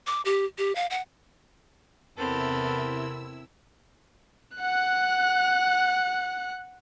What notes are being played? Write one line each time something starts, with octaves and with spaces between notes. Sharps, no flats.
D6
G4
G4
F5
F#5
E2 C3 B3 C4 E4 A4 A#4 E6
F#5 F#6